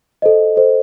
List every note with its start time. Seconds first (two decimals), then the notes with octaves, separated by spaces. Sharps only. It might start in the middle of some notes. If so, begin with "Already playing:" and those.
0.22 A4 C5 D#5
0.56 A4 C5 D#5